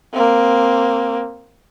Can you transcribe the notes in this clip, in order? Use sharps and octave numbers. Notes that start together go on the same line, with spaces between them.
A#3 C4